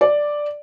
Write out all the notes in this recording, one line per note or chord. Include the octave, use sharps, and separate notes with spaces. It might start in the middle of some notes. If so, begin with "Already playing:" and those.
D5